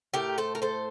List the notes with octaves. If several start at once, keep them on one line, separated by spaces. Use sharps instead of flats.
A2 A3 G4 A#4
A4 C5
A#4
A4 C5